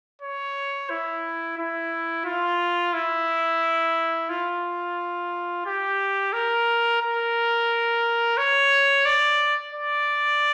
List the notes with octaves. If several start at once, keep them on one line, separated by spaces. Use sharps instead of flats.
C#5
E4
E4
F4
E4
F4
G4
A#4
A#4
C#5
D5
D5